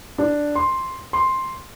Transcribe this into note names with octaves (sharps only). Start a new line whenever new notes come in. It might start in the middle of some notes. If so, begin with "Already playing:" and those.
D4
C6
C6